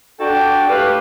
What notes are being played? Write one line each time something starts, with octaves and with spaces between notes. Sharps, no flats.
D4 F#4 A4 G5
A2 G4 B4 F5